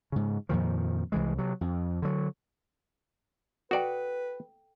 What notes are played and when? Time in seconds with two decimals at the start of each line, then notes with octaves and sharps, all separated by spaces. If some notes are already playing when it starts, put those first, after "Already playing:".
0.12 G#2 C#3
0.49 F2 A#2 D#3 F3
1.12 C2 E3 G#3
1.38 C3 F#3
1.61 F2
2.02 D3 F#3
3.71 F#4 A4 B4 D5 G5